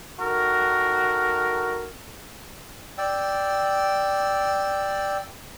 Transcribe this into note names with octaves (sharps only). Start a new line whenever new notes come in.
D#3 F#4 A4 A#4
D5 G5 E6